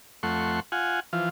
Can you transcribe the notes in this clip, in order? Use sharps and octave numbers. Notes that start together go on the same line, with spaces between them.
F2 A3 F#5 C6 C#6
F4 F#5 G#5
E3 F3 F4